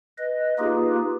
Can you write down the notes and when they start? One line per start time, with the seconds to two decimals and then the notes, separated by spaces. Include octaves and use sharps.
0.18 B4 D#5
0.59 A#3 D#4 F4 G4 G#4 B4